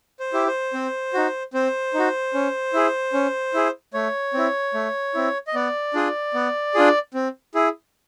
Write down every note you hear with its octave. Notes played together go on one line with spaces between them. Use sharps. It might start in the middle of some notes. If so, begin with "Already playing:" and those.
C5
E4 G4
C5
C4
D#4 F#4
C4 C5
D#4 F#4
C#4
E4 G#4
C#4
E4 G#4
A3 C#5
C4 E4
A3
C4 E4
D#5
B3 D5
D4 F4 G#4
B3
D4 F4 G#4
C4
E4 G#4